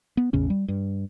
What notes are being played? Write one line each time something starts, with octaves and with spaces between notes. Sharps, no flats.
B3
A1 E2 C#3 C#4
G3
G2